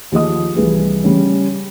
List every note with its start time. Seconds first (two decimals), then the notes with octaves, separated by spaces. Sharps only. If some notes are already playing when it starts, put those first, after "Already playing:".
0.12 D#2 F3 G#4 D#5 D#6
0.56 C2 E3 G#4 B4
1.04 C#3 G3 C#4